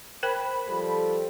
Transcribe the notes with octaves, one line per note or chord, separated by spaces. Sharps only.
A#4 C5 G5 B5
F3 G3 A4